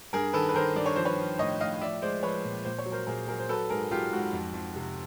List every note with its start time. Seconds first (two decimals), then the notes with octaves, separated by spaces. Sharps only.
0.13 G2 G#4 A#4
0.34 D#3 A4 B4
0.49 B4
0.55 D#3 A#4 C5
0.76 G2 D5
0.86 C#5
0.96 F3 C5
1.05 B4 C#5
1.18 F3
1.39 A2 C#5 D#5
1.60 A2 D#5 F5
1.81 F3 D5 E5
2.02 G#3 C5 D5
2.23 F3 B4 C#5
2.45 A#2
2.65 A#2 C5
2.78 C#5
2.86 F#3
2.92 A#4 C5
3.07 A#2 G#4 A#4
3.28 F#3 G#4 A#4
3.39 C5
3.49 F#3 A4 B4
3.70 G#2 G#4 A#4
3.91 F#3 F4 G4
4.13 G#2 F#4
4.33 F2
4.54 F2
4.76 C3